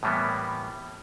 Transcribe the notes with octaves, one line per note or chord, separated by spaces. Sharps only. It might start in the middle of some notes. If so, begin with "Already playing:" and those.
A2 E3 G3 A#3 B3